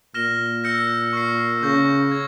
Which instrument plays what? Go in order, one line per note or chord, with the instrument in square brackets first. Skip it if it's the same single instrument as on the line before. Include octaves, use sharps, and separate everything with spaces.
[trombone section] A#2 [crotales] F6 A#6 E7 G7
[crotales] E6 G6 A#6 C#7
C#6 F6 C7
[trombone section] C#3 [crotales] C#6 G6 A#6
[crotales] G#6